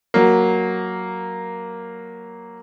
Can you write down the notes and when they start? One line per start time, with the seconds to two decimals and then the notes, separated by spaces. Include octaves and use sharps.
0.14 F#3 A#3